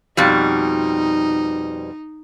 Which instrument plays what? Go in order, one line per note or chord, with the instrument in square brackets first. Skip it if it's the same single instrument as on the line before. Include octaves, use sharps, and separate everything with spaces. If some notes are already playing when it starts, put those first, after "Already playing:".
[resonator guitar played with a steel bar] F2 B2 G3 [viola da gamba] D#4